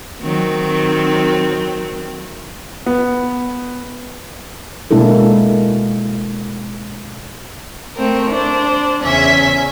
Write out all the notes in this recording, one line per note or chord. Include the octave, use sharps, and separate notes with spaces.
D#3 F#3 C4
B3
B2 G#3 A#3 D4 E4 A4
A3 C4 A#4
D4 C5
E2 C#3 C#4 E5 G#5